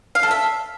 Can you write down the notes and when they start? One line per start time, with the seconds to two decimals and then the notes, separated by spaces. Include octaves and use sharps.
0.15 F5
0.23 A4
0.31 E5